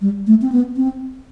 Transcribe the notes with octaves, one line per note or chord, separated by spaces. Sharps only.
G3
A3
C4
B3
C4